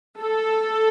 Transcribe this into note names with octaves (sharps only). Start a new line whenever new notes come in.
A4